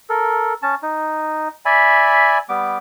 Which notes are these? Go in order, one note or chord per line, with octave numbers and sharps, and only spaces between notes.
A4 A#4
C#4 A5
D#4
D5 E5 G#5 B5
G3 B3 D6